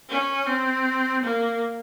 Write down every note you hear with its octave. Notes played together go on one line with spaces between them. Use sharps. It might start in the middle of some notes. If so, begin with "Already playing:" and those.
C#4
C4
A#3